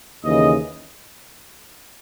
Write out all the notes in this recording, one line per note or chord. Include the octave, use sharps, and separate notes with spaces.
D#2 C#3 E3 D#5